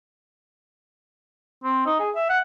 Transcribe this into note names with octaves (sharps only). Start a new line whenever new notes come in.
C4
D#4
G#4
E5
F#5